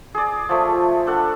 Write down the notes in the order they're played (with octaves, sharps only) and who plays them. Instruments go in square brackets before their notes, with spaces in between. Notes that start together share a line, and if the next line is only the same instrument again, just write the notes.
[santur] G#4 D5
F3 A3
D4 A4 F#5